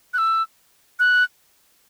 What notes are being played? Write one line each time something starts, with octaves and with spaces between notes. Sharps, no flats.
F#6
E6
F#6